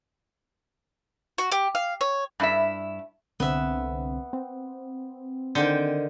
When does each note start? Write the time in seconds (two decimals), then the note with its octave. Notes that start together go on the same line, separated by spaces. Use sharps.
1.38 F#4
1.52 G4
1.75 F5
2.01 C#5
2.40 G2 E4 E5
3.40 C2 D3 B3 C4 E5
4.33 C4
5.55 D3 D#3 C5 G5